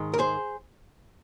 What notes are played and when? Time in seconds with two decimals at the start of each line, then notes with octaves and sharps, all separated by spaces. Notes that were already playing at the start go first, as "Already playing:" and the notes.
Already playing: G#2 D#3 G#3
0.14 A#4
0.19 G#4 C5